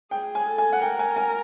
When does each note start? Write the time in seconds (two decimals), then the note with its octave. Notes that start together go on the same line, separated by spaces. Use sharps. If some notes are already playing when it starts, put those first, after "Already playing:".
0.11 G#4 G5
0.35 G#5
0.47 A4
0.58 G#5
0.73 F#5
0.81 A#4 G5
0.99 G#5
1.16 G#5